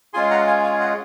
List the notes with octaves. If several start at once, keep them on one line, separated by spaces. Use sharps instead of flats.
G#3 C#4 F4 G#4 G#5 C6
F#5 A#5
F5 G#5
F5 G#5
D#5 F#5